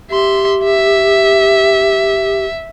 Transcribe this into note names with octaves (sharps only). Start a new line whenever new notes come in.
G4 E5 C6
E5